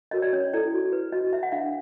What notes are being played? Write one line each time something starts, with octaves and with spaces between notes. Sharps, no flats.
F#4 A#4 C#5 D#5
D5
C#4 C#5
E4 A4 C5 D5
F#4
B4
F#4 D#5
B4 E5
F#5
D4 F5